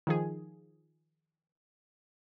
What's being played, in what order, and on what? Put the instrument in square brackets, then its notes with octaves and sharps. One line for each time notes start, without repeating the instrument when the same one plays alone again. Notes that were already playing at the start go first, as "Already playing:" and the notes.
[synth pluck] D#3 F3 G#4